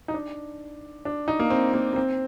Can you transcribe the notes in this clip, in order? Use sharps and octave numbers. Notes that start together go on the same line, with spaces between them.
D#4
D4
D4
D#4
A#3
C4
A#3
A#3
C4